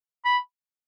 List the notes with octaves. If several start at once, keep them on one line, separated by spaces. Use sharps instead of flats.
B5